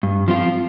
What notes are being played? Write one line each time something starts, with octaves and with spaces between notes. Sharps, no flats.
G2
F3 C4 F4